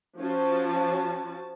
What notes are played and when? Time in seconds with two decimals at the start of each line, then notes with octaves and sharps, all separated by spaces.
0.18 F3 C#4 F#4 A5